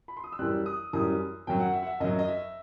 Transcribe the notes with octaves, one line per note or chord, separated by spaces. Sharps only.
B5
C6
D#6
E6
F#2 E3 G3 F#6
D#6
F#2 E3 G3 D#6
F#2 F#3 G5
F#5
E5
F#5
E5
F#2 F#3 D#5
D#5
E5